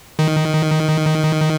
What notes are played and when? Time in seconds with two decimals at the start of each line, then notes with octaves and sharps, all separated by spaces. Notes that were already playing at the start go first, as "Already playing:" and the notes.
0.19 D#3